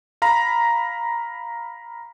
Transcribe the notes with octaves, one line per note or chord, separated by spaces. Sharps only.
F5 A#5 B5